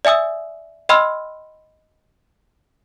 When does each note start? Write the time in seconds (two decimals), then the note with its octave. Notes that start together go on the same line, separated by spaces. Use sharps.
0.05 D5 E5 G#5 D#6 E6
0.89 D#5 G5 B5 C6 E6 F6